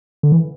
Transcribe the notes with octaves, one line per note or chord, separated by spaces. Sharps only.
D3
E3